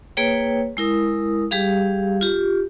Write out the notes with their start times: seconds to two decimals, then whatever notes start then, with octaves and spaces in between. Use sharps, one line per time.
0.17 A#3 G#4 B4 C#5 G5
0.77 G#3 E4 A#4 D#6
1.51 G3 G4 G#4 F5
2.21 F4 G4